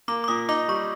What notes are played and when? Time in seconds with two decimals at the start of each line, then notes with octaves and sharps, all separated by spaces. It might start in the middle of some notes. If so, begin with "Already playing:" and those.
0.08 A#3 D6
0.24 D6
0.28 A#2 D#6
0.49 D#4 D6
0.68 G3 C#6